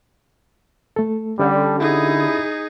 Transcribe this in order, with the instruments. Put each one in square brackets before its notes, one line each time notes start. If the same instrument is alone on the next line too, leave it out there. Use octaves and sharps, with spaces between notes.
[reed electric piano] A3 A4
[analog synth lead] D3 [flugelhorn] G3 [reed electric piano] C#4 G4
[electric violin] D#4 G#4 [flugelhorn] E4